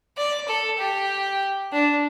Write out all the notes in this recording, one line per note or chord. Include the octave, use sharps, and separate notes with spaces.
D5
A4
G4
D4